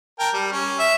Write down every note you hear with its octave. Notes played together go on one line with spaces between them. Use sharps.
A#4 G5 A5
G3
C#4
E5